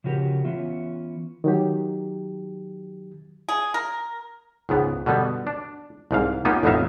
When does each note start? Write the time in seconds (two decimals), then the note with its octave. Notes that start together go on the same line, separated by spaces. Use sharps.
0.04 C#3 F3 C#4 F#4 G4 A#4
0.44 E3 B3 C#4 F4 E5
1.44 D#3 F#3 G4
3.49 G#4
3.74 A#4
4.69 C#2 G#2 B3
5.06 B2 D3 G3 B3
5.47 D4
6.11 C2 G#2 F5
6.45 A#3 B3 C#4 D#4 F4 G4
6.63 A1 F2 B3 D#4 E5 F5